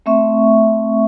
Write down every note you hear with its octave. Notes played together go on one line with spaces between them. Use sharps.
A3 C4 E5 C#6